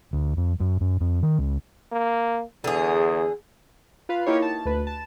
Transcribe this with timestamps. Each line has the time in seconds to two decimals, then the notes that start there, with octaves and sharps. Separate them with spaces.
0.13 D2
0.37 F2
0.60 F#2
0.81 F#2
1.01 F2
1.22 D#3
1.39 C#2
1.92 A#3
2.64 E2 D3 G#4
4.09 F4 B4 F5
4.26 A#3 D#4 E4 G4 C#5
4.42 A5
4.65 D2 B4
4.87 A5